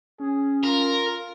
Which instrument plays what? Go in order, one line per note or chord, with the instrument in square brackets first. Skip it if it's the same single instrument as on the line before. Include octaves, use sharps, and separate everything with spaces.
[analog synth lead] C#4 [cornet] G#4
[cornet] F4 [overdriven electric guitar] A#4